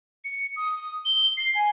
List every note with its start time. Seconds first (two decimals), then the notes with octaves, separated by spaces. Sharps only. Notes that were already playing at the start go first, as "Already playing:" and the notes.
0.24 C#7
0.56 D#6
1.05 G7
1.37 C7
1.55 G#5